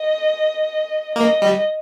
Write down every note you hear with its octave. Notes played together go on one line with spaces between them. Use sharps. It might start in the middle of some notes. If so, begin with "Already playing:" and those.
Already playing: D#5
A#3 D#5
G3